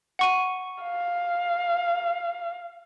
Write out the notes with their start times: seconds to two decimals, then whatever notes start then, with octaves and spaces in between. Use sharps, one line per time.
0.19 F#5 C#6 D#7
0.83 F5